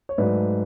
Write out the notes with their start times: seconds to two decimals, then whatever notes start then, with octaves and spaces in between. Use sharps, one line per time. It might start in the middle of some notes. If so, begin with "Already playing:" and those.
0.09 C#5
0.18 G#2 F#3 A3 B4 D5